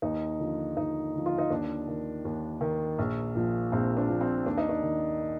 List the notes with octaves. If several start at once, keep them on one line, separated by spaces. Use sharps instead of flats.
D#2 D#4
D3 F3
D#2 D#4
D3 F3
F4
D#4
D#2 D4
D#3
D#2
D#3
A#1
A#2 F3
A#1 C4
D4
A#2 F3
C4
D#2 D4
D#4
D4
D#3